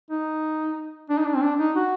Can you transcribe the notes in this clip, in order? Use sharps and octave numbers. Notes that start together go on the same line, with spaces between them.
D#4
D4
D#4
D4
C4
D4
D#4
F#4